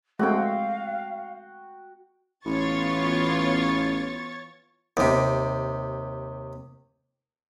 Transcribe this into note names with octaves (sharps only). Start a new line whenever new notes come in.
G#3 A3 C4 F#4 F5 G5
A1 E3 B3 F4 C#5 C#6 A6
D#2 C3